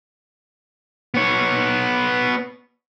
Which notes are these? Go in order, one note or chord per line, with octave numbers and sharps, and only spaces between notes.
B3 C#5